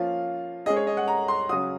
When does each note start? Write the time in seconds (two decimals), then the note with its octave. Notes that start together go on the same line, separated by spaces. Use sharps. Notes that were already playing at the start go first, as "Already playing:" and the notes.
Already playing: F3 A#3 C#4 F4 F5
0.66 G#3 C#4 G#4 D#5
0.76 C#5
0.87 D#5
0.97 F#5
1.08 A#5
1.28 C6
1.49 C#3 F#3 C#4 F#4 D#6